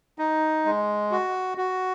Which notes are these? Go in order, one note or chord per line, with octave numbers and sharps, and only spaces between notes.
D#4
G#3
F#4
F#4